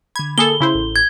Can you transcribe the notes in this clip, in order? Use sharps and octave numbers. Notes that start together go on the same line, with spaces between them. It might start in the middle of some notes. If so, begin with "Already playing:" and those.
D3 B5 G#6
A#3 G#4 A4 G7
C#3 E4 C5
A1
G#6